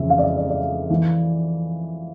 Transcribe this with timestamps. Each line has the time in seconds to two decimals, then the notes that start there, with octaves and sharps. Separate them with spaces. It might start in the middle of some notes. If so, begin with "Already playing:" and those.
Already playing: F2 C#3 E3 E5
0.10 F5
0.18 D5
0.23 D#5
0.37 D5
0.49 D5
0.90 E3